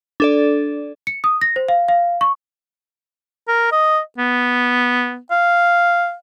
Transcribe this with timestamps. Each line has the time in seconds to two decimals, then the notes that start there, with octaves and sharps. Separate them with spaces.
0.20 D4 A4 D5
1.07 C#7
1.24 D#6
1.41 A#6
1.56 C5
1.69 F5
1.88 F5
2.21 C#6
3.48 A#4
3.72 D#5
4.18 B3
5.31 F5